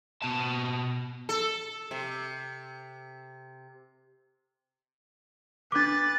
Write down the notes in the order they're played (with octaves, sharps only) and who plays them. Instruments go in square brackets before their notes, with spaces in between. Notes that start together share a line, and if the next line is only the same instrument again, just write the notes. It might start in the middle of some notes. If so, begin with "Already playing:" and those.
[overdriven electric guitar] B2 A5
[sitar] A4
C3
[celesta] D4 D6 [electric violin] B4 A6